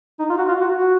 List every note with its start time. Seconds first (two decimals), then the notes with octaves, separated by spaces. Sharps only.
0.20 D#4
0.30 F4
0.38 F#4
0.49 F4
0.61 F#4
0.76 F#4